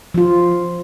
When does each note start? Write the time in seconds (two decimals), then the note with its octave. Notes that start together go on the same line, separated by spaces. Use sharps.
0.14 F3 F4